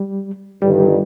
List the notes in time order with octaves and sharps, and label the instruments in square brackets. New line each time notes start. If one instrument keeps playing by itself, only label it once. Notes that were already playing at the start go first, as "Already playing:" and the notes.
Already playing: [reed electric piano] G3
[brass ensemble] G1 G2 D#3 [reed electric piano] G3